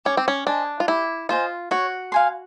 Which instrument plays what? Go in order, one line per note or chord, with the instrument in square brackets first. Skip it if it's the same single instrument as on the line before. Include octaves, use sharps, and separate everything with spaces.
[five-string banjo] C#4 [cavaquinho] G4
[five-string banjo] C4
C#4
[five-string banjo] D4 [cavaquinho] C5 D#5 G#5
[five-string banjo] F4
[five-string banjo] E4 [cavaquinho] G4
[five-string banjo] F4 [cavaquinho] C5 D#5 G#5
[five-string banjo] F#4 [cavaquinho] C#5
[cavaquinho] F5 G#5 C6